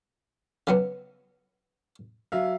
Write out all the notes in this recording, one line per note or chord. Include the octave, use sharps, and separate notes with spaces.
C#3 F#3 B3
F#3 E5 F5